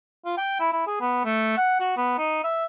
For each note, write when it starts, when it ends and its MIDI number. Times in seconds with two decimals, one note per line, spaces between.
0.25 0.34 65
0.37 0.55 79
0.60 0.70 64
0.72 0.86 64
0.87 1.00 68
1.01 1.21 59
1.24 1.54 57
1.57 1.77 78
1.80 1.96 66
1.97 2.14 59
2.18 2.42 63
2.44 2.65 76